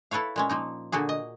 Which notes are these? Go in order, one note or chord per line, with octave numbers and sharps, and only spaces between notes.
E4 A4 B4 C#5 F5
A#2 G#3 C#4
F3 A#3 D#4
A#2 D3 A#3 F#4 G#4
D#5